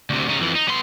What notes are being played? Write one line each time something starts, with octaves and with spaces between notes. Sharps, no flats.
D2 C3
C#3 D#4
F2 E3
D#4
B3 C6